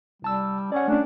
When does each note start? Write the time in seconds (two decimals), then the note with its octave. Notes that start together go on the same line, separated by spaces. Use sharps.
0.22 C2 G3 A5 E6
0.72 C#4 D5 F#5
0.88 A3 C#4 D4